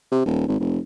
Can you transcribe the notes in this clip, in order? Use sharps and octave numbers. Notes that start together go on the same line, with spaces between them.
C3
D#1
G#1
F1